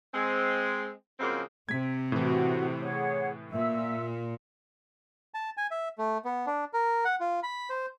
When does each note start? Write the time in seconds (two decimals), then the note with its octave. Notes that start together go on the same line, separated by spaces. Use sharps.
0.13 G#3 C4
1.20 C#3 F3 F#3 G#3 A#3 C4
1.69 C3 G#6 B6
2.12 A2 E3 F#4
2.81 G#4 C#5 F#5
3.51 A#2 E5 E6
5.34 A5
5.57 G#5
5.71 E5
5.98 A3
6.25 B3
6.46 D4
6.73 A#4
7.05 F#5
7.20 F4
7.43 B5
7.70 C5